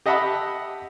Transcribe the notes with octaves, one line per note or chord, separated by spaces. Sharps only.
G4 D#5 E5 F#5 A5 B5